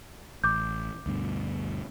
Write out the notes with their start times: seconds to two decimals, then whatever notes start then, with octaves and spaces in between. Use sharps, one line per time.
0.44 A1 D6 G6
1.06 D2 G2 B2